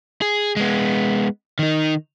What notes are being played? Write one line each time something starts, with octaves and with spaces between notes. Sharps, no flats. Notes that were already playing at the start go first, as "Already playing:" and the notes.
G#4
G#3 B3
D#3 D#4